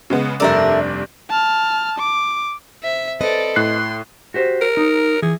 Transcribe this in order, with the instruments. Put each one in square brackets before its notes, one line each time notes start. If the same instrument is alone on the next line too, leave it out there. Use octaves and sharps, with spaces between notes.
[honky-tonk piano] C#3 G#3 B3
[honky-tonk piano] F1 G2 D5 [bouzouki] A4 A#4 E5
[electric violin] A5 F6
D6
[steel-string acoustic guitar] C3 [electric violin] E5
[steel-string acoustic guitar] C4 B4 D#5 [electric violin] A4 D5
[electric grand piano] A2 F#6 C7 [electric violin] C6
[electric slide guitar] F#4 G4 C5
[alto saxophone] A#4
[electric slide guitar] D#4
[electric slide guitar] E3 [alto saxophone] G#4